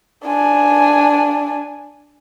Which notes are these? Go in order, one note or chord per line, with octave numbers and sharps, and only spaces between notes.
D4 G#5